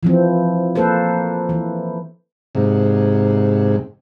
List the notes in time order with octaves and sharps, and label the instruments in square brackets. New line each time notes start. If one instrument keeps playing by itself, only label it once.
[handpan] E3 F3 C4
A#3 A4 B4 C5
E3
[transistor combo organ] G#2 C3